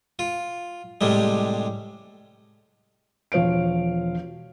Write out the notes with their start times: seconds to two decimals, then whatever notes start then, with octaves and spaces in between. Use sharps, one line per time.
0.19 F4
1.01 A2 C3 G3 G#3
3.32 E1 F3 C#5 F5 D7